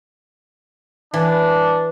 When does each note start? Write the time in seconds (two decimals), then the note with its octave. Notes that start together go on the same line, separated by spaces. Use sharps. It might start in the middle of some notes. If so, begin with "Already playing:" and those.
1.14 E3 D4